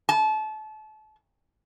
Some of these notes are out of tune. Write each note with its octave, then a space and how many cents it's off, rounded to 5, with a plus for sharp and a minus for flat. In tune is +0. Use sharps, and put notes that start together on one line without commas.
A5 -30